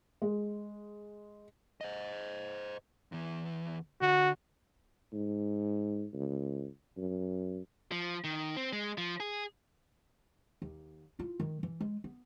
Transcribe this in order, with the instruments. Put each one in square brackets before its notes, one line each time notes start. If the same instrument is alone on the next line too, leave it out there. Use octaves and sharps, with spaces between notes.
[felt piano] G#3
[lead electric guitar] C5 D#5
E2 E3
[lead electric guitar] D3 [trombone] F#4
[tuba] G#2
C#2
F#2
[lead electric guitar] F3
D#3
C4
G#3
F3
G#4
[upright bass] D#2
E4 F4
D#3 G#3
E3
G#3
B3